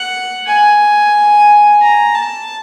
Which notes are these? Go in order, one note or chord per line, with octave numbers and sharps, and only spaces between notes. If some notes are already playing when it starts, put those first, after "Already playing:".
Already playing: F#5
G#5
A#5
A5